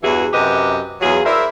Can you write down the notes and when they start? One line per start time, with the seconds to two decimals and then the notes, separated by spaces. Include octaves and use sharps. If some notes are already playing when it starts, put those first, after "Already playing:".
0.03 E2 G2 E3 F#4 G#4
0.33 F#2 C3 G4 B4 D#5
1.01 E2 F#3 F4 G#4
1.25 E4 A#4 C5 D5 E5